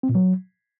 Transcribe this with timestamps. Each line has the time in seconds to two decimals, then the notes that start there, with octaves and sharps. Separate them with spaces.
0.03 C4
0.09 A#2
0.15 F#3